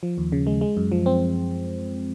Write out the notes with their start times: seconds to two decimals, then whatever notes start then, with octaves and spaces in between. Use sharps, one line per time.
0.03 F3
0.18 D#2
0.32 C#3
0.47 G#3
0.61 G#3
0.77 F#2
0.92 F3
1.06 C4